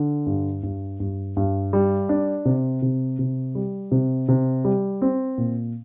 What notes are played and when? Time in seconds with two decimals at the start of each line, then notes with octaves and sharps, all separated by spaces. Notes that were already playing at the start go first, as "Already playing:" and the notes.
Already playing: D3
0.27 G2
0.63 G2
1.00 G2
1.37 G2
1.73 G3
2.09 D4
2.45 C3
2.82 C3
3.19 C3
3.55 G3
3.91 C3
4.28 C3
4.65 G3
5.02 C4
5.38 A#2